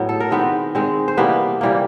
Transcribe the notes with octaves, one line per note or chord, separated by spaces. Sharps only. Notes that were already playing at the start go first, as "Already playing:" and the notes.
Already playing: A2 F#3 B3
A4
A#4
D#3 G#3 B3 C4 B4
D#3 G#3 C4
C5
C3 E3 G3 A#3 B3 B4
C3 E3 G3 A#3